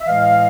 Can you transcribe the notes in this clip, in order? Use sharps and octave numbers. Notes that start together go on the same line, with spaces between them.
E5
A2 E3 G#3 D#5 F5